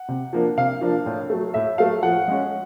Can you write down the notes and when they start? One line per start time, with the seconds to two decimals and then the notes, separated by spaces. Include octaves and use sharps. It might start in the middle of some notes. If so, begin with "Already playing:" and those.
Already playing: F#5
0.08 C3
0.33 F3 A#3 D4
0.57 C3 F5
0.81 F3 A#3 D4
1.06 A2
1.30 F#3 A3
1.54 A2 E5
1.78 F#3 A3 F5
2.03 F3 F#5
2.28 G#3 C#4